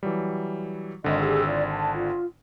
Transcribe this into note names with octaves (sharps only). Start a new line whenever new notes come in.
E3 F#3 G3
G#1 D3 D#5
G4 G#4 E6
F4 D5
A5
F4